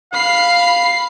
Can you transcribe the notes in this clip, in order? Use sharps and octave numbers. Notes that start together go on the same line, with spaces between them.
F5 B5 C7